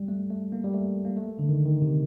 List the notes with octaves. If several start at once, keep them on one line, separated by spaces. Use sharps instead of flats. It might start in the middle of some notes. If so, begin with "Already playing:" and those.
Already playing: G3
A3
A3
A#3
G3
A3
A#3
A3
D3
D#3
D#3
C3